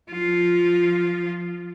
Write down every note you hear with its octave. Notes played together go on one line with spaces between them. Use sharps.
F3 F4